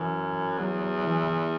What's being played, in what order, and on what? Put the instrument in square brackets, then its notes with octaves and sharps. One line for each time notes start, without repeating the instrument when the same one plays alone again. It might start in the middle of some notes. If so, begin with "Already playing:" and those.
Already playing: [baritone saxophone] F#2 [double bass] E3
[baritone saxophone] E2 [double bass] F#3
[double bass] E3